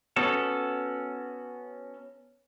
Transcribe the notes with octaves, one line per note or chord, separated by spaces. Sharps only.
B3 C#4 F#4 A4